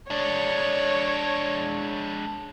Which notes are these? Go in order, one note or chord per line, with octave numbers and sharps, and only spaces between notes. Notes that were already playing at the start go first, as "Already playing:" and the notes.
G#3 D4 C#5